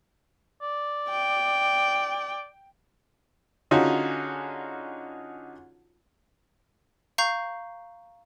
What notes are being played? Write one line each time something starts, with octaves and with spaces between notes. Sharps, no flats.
D5
G5
D3 C#4 D#4 F4 F#4 G#4
F5 A#5 C#6 G6 C7